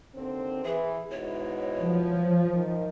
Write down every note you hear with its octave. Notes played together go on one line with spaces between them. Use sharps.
D#2 D3 C4
E3 G#4
G#2 B2 E4 C#5
F3
D#3